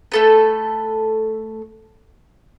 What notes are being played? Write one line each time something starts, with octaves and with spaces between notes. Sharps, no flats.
A3 A4 B4